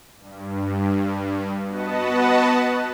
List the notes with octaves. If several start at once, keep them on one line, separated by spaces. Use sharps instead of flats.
G2
B3 F#4 B4 D#5 F#5 A5